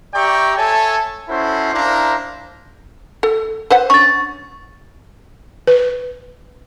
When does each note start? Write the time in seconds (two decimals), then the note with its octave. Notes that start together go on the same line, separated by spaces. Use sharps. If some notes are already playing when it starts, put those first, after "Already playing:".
0.14 G4 D5 E5 G5 A#5 C#6
0.57 A4 C#5 E5 G#5 A5
1.28 C#4 E4 F#4 A4 C5
1.73 D4 E4 A#4 C5 F5 A#5
3.23 A4
3.70 B4 C5 F#5
3.90 C#4 D4 C#6 A6
5.67 B4